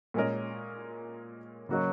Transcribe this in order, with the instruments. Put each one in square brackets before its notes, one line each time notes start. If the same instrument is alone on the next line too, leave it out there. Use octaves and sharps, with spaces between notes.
[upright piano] A#2 G#3 C#4 A#4 D#5
[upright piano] C#3 A#3 F#4 D#5 [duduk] F#3